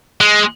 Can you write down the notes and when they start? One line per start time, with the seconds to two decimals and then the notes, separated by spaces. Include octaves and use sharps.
0.21 G#3